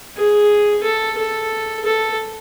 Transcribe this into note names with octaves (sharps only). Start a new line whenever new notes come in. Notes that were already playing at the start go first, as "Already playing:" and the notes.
G#4
A4
A4
A4